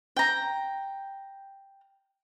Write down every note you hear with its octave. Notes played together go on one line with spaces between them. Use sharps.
G5 A#5